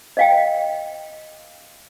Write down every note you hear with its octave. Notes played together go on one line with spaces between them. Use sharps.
D#5 F5 G5